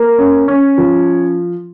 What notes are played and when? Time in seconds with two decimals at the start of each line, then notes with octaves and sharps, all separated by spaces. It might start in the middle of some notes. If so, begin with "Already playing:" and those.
Already playing: A#3
0.18 C#4
0.48 C#4
0.78 F3